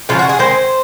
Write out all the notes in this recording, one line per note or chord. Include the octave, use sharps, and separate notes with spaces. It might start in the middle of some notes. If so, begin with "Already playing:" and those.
C#3 F3 G#3 C#4 F4
F#4
G#4
D#3 G#3 C4 C5